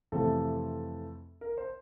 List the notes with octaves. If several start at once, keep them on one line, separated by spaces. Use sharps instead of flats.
F2 C3 E3 A3 C4 A4
A#4
C5